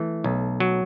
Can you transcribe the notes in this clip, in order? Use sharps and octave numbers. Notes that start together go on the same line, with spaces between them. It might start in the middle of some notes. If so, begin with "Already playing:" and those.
Already playing: E3 A3
B1
F#3